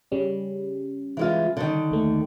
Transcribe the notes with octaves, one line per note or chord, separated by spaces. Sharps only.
C#3 G3 C#4
E3 G#3 F4
D3 D#3
D#2 A3